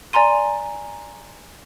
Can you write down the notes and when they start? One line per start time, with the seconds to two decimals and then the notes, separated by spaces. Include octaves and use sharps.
0.13 D5 G#5 A#5 C6 D#7